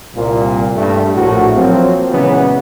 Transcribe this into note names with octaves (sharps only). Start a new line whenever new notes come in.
C2 A#2
G2 A3
A#1 A2 F#4
F3 F#3 A#3 C4
A#2 C#3 E3 F#3 G#3 B3